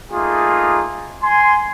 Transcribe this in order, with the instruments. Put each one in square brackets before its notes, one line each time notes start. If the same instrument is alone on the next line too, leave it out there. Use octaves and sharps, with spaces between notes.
[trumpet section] A3 A#3 D#4 F4 G#4
G#5 C6